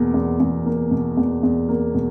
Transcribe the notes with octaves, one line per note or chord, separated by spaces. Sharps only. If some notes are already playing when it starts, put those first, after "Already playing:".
Already playing: E2 B2 A#3
E2
E2
A#3
B2
E2
E2
A#3
B2